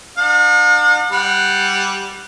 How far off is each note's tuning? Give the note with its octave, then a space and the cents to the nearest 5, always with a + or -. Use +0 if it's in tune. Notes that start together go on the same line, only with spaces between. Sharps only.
D4 +45 F#5 -45
G3 +0 F#5 +0